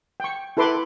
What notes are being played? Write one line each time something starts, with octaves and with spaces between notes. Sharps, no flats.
G5 C#6
E4 A4 B4 C6 D6